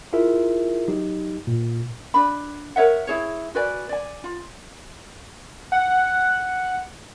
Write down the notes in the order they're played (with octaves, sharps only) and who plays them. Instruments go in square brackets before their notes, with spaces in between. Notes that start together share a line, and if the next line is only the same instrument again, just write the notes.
[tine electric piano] E4 F4 G#4 A#4 E5
F#3 D#4 G4
A#2
[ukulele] D4 B5
A#4 C#5 E5 F#5
E4 G#4 C#5
F#4 B4 D5 G#5
D5 G#5
F4
[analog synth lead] F#5